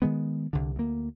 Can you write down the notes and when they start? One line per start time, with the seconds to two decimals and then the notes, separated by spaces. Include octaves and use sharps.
0.02 D#3 G#3 B3
0.53 C2 D3
0.76 D2 A#3